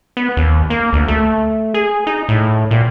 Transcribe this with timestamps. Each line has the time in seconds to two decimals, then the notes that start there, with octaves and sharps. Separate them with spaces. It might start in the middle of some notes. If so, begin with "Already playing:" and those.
0.17 B3
0.37 D#2
0.70 A#3
0.93 D2
1.08 A3
1.74 G#4
2.07 D#4
2.28 A2
2.71 A#2